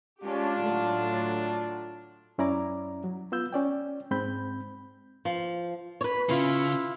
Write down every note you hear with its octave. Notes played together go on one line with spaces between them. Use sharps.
G#3 C#4 D4 F4 G4
A2 D3 F#3
F#2 C#4 E4 D5 A#5 D6
F#3
B3 F4 E6 G6
C#4 D5 G5
G#2 C4 B5 G6
F3
B4 C#5
C#3 E4 F4